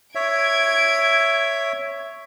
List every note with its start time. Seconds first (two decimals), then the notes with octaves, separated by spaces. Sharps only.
0.15 C#5 E5 G#6 D7